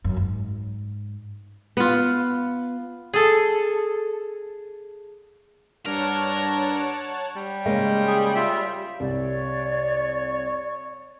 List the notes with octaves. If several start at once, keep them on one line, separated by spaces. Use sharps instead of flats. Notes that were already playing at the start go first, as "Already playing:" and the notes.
F#2
G#2
B3 F4
G#4 A4
G2 D4 A#4 C#5 F#5 A5
G3
C#3 G#3 A#3
G#4
F4 E5
C2 C#5 D5